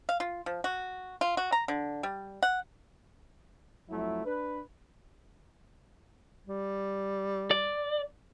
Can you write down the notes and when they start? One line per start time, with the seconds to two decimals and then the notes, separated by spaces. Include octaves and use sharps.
0.09 F5
0.20 F4
0.46 F3
0.64 F#4
1.21 F4
1.37 F#4
1.52 A#5
1.68 D3
2.03 G3
2.43 F#5
3.90 F2 F#3 A3 E4
4.24 D4 B4
6.47 G3
7.51 D5